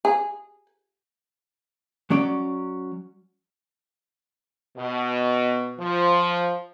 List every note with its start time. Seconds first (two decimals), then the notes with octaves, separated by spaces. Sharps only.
0.05 G#4
2.10 F#3 C#4 D5
4.77 B2
5.79 F3